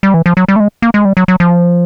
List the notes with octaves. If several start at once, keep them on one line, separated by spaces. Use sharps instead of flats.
G3
E3
F3
F#3
G3
A3
G#3
A#3
G#3
G3
F#3
F#3
F3